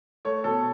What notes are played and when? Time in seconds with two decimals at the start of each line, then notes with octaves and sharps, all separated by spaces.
0.25 A3 C#5
0.44 B2 A4